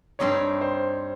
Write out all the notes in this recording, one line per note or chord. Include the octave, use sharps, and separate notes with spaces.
G2 G3 C4 D#4 G4 C#5
C5